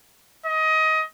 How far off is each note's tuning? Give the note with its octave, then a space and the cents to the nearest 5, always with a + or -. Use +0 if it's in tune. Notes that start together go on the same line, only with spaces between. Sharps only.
D#5 +20